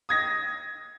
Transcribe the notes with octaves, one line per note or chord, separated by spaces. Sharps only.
D#6 G#6 A#6